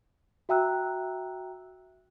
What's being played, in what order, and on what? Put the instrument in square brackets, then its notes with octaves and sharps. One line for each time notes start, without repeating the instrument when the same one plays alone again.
[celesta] F#4 E5 G5 A#5 E6 F#6